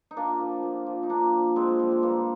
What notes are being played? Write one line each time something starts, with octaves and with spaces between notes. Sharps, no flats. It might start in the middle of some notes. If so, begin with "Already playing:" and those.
D#4
A#2 A#3 D4
F3
A#2
F3
D#4
A#2 A#3 D4
F3
A#2 G#3 C4
G#3
F3 G3
G#3
G2 G3 A#3